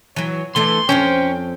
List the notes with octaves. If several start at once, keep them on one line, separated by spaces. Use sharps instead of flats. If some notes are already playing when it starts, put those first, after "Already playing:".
E3 F#3 C#5
E3 A3 D4 A4 C6
F2 C#4 C5 C#5 G5